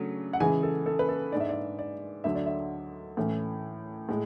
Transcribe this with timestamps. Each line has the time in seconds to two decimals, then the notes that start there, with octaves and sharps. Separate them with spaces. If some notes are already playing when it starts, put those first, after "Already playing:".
Already playing: C#3 F#3 A3 D4
0.33 F#5
0.40 C#3 E3 G#3 G#5
0.63 A4
0.86 A4
0.99 B4
1.09 A4
1.32 G#2 G#3 D4 D5
1.40 E5
1.49 D5
1.79 D5
2.24 D2 D3 F#3 E5
2.35 D5
2.46 E5
3.17 A2 E3 A3 C#4
4.09 A2 G#3